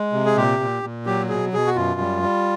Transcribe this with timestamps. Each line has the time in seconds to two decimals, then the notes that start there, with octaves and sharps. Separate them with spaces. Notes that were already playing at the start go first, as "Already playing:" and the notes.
Already playing: G#3
0.13 C3
0.25 G#4
0.36 A#2 G4
0.60 A#2
0.83 A#2
1.06 F#3 G4
1.29 B2 G#4
1.53 B2 G#4
1.67 F#4
1.76 F#2 F4
2.00 G3
2.23 G3